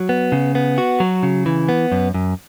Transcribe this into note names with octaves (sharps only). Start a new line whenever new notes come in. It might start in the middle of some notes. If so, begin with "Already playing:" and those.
Already playing: F#3
B3
C#3
B3
F#4
F#3
C#3
E3
B3
F#2
F#2